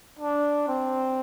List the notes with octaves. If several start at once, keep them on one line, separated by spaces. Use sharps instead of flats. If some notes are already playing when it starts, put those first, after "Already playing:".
D4
C4